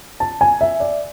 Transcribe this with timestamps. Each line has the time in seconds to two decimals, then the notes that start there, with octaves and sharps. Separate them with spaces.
0.20 A5
0.41 G#5
0.61 E5
0.80 D5